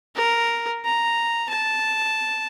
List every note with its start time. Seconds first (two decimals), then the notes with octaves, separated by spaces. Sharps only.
0.15 A#4
0.85 A#5
1.49 A5